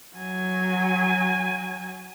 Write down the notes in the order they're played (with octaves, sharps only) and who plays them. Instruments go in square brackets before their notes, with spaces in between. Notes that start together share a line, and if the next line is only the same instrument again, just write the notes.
[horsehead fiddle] F#3 G#5